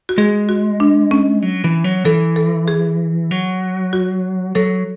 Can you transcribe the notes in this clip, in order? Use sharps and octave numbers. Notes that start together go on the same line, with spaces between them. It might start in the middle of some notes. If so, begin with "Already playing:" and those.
F#4
G#3 G#4
F#4
D4
C#4
F#3
E3
F#3
E3 A4
A4
G#4
F#3
F#4
F#3 A4